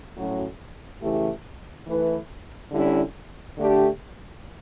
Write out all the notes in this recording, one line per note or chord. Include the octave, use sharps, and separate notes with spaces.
A2 F#3 C#4 F#4
C#3 E3 A3 E4 G4
E3 A3 E4 B4
D3 G3 C#4 E4
D3 A3 D4 G4